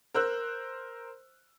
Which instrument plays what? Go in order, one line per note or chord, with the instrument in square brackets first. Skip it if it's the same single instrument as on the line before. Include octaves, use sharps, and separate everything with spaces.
[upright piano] A#4 C5 E6 F#6